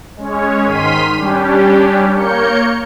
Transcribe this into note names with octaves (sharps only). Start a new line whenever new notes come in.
G#3 C#4 C#5
G#2 D#3 C6 F6 B6 D#7
G3 C#4 D4 G4
A#3 A#4 C#5 G6 C#7